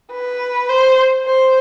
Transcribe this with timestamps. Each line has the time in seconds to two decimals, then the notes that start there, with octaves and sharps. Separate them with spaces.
0.12 B4
0.69 C5
1.26 C5